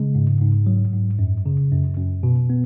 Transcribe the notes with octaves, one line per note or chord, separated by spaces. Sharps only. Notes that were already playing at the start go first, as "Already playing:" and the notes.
Already playing: C#3 G#3
G#2
G#2
F#3
G#2
F#2
C#3
F#2
F#2
B2
B3